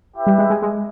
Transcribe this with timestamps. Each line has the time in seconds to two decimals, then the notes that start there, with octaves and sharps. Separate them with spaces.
0.15 E4 G4 B4 E5
0.27 G3
0.38 G#3
0.50 G#3
0.62 G#3